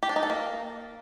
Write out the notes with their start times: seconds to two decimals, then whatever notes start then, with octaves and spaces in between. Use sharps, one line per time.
0.03 G4
0.09 D4
0.16 D#4
0.23 A4
0.30 A#3